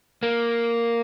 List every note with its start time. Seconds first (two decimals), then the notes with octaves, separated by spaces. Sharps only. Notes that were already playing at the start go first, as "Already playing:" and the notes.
0.23 A#3